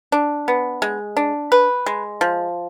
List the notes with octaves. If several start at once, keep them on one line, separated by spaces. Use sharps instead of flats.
D4
B3
G#3
D4
B4
G#3
F3